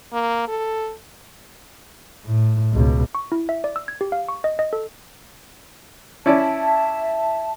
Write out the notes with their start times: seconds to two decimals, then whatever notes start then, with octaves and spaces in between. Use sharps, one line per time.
0.13 A#3
0.48 A4
2.25 A2
2.73 C#2 B2
3.15 C#6
3.32 E4
3.49 E5
3.64 D5
3.76 E6
3.88 G#6
4.01 G4
4.12 F5
4.29 C#6
4.44 D#5
4.59 D#5
4.73 A4
6.26 C#4 E4 D5 E5 A5